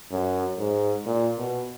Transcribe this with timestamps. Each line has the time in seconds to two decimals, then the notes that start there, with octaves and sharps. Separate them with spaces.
0.11 F#2
0.59 G#2
1.06 A#2
1.38 B2